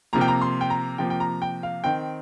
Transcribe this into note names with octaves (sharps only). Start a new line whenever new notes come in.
C3 F3 A#3 A#5
G5
A#5
C6
G5
A#5
C3 F3 A#3 G5
G5
A#5
G5
F5
D#3 C4 G5